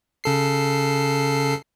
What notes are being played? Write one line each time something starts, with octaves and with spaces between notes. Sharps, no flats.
C#3 A4 C7